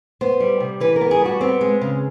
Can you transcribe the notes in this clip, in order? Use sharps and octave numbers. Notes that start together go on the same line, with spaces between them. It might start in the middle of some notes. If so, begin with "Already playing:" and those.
B3 C5
G3
C3
E3 B4
A#4
B3
G#4
G3 F#4
B3 C4
G#3
C#3